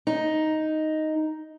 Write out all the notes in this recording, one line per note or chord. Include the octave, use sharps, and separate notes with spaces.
D#4